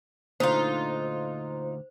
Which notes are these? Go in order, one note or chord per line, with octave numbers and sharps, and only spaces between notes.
D2 A#2 D3 D#4 F4 C5